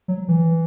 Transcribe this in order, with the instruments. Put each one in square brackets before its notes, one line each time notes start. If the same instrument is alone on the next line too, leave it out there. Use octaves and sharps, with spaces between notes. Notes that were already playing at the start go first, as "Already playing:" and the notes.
[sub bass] F#3
E3